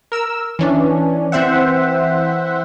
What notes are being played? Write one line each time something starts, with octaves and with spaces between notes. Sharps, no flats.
A#4 E6
E3 C#4 D4
E3 C4 C5 E5 F#5